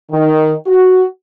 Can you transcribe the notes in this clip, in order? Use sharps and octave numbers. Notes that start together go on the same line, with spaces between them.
D#3
F#4